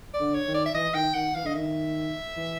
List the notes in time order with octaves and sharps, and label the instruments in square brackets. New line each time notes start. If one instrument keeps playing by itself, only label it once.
[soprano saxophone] D5
[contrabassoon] D3
[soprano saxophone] C#5
[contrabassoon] D#3
[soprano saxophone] D5
E5
[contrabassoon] E3 [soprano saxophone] D#5
[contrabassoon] D#3 [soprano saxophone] G5
[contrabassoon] D#3 [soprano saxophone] F#5
[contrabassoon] E3 [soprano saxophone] F5
[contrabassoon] D3 [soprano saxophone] D#5
[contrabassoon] D#3 [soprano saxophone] E5
[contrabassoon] E3